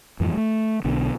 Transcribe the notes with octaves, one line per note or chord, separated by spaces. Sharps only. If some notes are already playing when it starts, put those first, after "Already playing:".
F2 G#2 E3
G#3 A3
B1 B2 D3